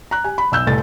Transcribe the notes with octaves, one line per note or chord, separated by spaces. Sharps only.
A#5 F#6
G4 G#5
B5
B1 E6 G6
F1 C2 A2 A4 A6